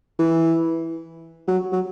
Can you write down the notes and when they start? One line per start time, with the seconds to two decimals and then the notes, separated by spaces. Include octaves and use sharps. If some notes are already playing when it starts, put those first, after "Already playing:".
0.19 E3
1.48 F#3
1.73 F#3